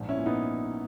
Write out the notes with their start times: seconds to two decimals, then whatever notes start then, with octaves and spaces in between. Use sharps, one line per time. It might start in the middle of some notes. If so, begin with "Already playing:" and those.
Already playing: A#1 G#2
0.08 C#4 E4
0.17 A#2
0.26 B3 D#4